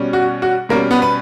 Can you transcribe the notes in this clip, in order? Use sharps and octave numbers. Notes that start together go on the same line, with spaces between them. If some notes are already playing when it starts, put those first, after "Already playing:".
Already playing: B2 G3 C#4
F#4
F#4
B2 G3 A#3 C#4 A#4
B3 B4
B4